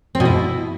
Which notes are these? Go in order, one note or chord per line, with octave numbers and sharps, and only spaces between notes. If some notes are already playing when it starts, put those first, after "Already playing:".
C4
B2
E4